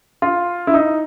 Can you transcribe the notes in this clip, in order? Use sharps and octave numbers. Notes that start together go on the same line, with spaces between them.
F4
E4
D#4